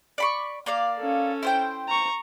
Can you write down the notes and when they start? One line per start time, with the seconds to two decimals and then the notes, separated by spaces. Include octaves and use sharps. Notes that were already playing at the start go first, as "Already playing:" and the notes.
0.18 D5 B5 C#6
0.66 A#3 D5 F5
0.98 C#4 A4
1.43 E4 C5 G5
1.89 A#5 C#6